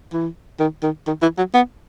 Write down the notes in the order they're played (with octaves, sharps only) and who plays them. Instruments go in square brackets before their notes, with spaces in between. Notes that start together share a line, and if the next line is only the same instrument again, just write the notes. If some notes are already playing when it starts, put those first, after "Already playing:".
[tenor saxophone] E3
D#3
D#3
D#3
E3
F#3
B3